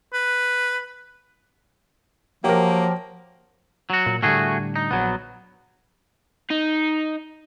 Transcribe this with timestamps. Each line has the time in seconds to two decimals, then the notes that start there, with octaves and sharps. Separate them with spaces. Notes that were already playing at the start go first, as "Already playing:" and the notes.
0.14 B4
2.44 F3 F#3 A#3 G4 A#4
3.90 F#3 F#4
4.06 A#2
4.23 A2 D3 G3 A3 F#4 G#4
4.76 D#4
4.91 A#1 F#3 B3
6.50 D#4